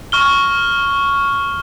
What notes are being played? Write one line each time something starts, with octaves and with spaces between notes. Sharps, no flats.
C#6 F6 G7